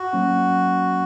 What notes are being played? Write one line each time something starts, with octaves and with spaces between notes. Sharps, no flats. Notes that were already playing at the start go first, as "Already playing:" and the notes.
Already playing: F#4
F#3 A#3 C#4